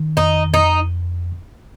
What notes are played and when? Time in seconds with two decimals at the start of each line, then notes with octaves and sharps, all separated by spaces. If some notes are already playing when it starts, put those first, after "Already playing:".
Already playing: D#3
0.17 F2 D#4
0.53 F2 D#4